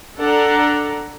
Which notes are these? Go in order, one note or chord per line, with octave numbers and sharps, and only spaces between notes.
D4 A4 D5 F#5 A#5